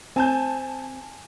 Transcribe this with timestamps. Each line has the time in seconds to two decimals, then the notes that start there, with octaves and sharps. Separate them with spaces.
0.16 C4 G#5 A5 G6